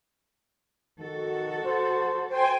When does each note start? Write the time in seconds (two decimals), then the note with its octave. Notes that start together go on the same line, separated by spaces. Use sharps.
0.99 D#3 F#4 A4
1.65 C5
2.28 C5 G5 G#5